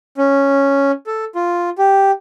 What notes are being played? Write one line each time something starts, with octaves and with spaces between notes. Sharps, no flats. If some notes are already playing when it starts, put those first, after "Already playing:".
C#4
A4
F4
G4